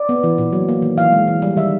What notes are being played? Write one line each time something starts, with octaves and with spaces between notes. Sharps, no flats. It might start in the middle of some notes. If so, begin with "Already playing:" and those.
Already playing: D5
B3
E3
A#2
F#3
A#3
D#3
E3 F5
G#3
E3
G3
D#3 E5